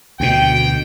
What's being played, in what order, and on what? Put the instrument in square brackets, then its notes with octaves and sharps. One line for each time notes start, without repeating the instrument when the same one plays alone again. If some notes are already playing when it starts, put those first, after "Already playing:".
[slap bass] D2 B2 [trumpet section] G5